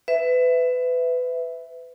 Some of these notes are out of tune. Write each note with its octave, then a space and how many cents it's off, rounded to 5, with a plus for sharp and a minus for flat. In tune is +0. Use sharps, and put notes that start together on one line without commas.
B4 +25 E5 +0